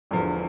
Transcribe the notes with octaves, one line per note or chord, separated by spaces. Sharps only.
E1 E2 D3 F3